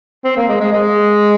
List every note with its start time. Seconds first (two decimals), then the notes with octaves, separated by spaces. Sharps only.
0.25 C4
0.36 A#3
0.48 G#3
0.60 G#3
0.72 G#3